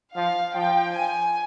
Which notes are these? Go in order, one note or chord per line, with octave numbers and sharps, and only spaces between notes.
F3 F5
F3 G5
G#5